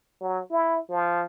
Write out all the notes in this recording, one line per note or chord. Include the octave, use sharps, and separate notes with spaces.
F#3
E4
F3